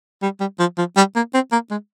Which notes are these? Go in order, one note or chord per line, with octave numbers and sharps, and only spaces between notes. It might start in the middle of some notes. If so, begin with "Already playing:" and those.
G3
G3
F3
F3
G3
A#3
C4
A#3
G#3